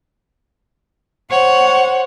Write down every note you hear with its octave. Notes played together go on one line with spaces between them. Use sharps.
C5 C#5 F#5